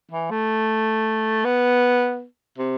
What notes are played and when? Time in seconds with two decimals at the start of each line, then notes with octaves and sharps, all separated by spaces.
0.11 E3
0.30 A3
1.45 B3
2.58 C3